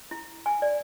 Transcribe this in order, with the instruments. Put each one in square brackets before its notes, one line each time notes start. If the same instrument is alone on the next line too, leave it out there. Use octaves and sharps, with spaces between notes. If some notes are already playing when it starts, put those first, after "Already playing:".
[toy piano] E4
G#5
D5